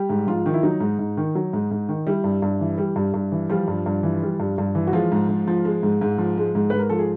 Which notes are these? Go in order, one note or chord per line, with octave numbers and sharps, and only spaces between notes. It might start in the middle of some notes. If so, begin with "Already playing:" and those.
Already playing: G3 G4
G#2
G#2 F3 F4
D#3
E4
F#3 D#4
G#2
G#2
D#3
F#3
G#2
G#2
D#3
G3 E4
G2
G2
E3
G3
G2
G2
E3
F3 G3 F4
G2
G2
E3
G3
G2
G2
E3
F#4
F3 G#3 F4
G#2
G#2
F3
G#3
G#2
G#2
F3
G#3
G#2
G#2 B4
A#4
F3 A4
G#4